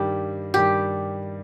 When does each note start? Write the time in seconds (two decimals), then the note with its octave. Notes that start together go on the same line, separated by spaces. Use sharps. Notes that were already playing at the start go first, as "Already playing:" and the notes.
Already playing: G2 D#3 G3 G4
0.54 G2 D#3 G3 G4